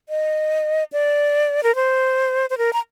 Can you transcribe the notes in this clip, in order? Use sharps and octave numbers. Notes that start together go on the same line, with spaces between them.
D#5
D5
A#4
C5
C5
A#4
A#5